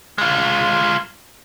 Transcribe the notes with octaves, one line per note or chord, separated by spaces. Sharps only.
G#3 F4